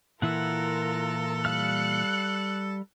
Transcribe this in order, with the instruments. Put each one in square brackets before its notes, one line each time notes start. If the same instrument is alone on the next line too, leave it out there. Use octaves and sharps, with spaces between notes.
[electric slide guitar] A#2 E3 E4 [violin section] F4 A#4 [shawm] A4 [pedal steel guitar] F#5
[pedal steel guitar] G3 F5 F6 [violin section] F#6 C#7